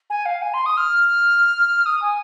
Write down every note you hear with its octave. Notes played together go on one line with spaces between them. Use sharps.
G#5
F5
G#5
C6
D#6
F6
D#6
G#5